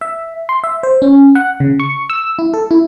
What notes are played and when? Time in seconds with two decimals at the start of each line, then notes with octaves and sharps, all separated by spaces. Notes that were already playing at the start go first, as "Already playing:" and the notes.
0.01 E5
0.49 C6
0.64 E5
0.83 C5
1.02 C#4
1.35 F#5
1.60 C#3
1.80 C#6
2.10 E6
2.39 E4
2.54 A4
2.71 E4